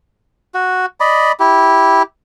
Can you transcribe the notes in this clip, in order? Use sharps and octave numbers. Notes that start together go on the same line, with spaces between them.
F#4
D5 D#5 B5
E4 G4